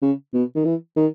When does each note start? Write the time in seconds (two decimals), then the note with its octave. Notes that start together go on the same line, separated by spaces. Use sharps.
0.02 C#3
0.34 B2
0.55 D#3
0.65 E3
0.97 D#3